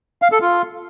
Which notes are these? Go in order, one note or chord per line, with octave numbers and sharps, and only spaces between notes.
F5
A4
F4